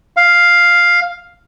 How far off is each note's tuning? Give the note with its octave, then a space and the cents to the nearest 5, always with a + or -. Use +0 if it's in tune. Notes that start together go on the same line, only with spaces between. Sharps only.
F5 +5